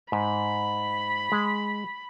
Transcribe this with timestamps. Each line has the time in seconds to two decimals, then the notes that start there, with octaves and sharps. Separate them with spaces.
0.12 G#2 B5
1.32 G#3